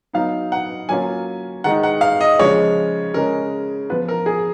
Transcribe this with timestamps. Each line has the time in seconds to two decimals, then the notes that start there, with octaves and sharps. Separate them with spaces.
0.13 F#3 B3 D#4 F5
0.52 F#5
0.89 F#3 A#3 C#4 F4 G#5
1.64 D#3 G#3 D#4 F#5
1.83 F#5
2.01 F5
2.21 D#5
2.39 C#3 F3 G#3 C#5
3.14 C#3 G#3 C#4 A#4
3.90 F3 B3 F4 B4
4.08 A#4
4.26 G#4